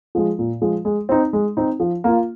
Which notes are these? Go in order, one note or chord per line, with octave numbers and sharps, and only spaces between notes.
F3 G#3
A#2
F3 G#3
G#3
C4 D#4
G#3
C4 D#4
F3
A#3 F4